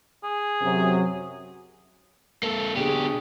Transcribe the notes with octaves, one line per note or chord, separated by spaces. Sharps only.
G#4
F#2 C3 F#3
A#3 A4
B2 D4 G4 G#4